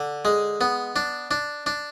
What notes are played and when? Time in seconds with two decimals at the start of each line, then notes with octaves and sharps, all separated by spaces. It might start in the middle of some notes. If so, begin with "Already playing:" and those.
Already playing: D3
0.25 G#3
0.61 B3
0.96 D4
1.31 D4
1.66 D4